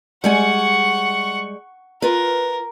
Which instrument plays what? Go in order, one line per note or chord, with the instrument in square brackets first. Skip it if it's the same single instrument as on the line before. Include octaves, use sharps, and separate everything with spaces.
[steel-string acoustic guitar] G3 G#3 G#5 [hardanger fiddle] F#5 C#6
[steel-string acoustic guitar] F4 B4 [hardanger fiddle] A#4